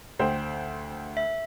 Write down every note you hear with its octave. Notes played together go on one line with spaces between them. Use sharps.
D2 C5 G5
E5